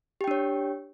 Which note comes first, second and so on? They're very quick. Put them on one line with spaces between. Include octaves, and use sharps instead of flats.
G4 G5 D4 C#5